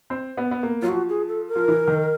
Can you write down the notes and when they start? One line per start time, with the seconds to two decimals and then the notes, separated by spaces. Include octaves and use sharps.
0.10 C4
0.37 B3
0.51 B3
0.63 A#3
0.82 F#3 F4
0.89 F3 F#4
1.09 G#4
1.28 A4
1.48 A#4
1.55 F3
1.68 E3
1.88 D#3